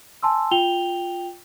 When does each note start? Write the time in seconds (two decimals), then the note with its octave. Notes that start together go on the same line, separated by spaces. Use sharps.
0.23 G#5 A5 C6 E6
0.51 F4 G5 F7 G7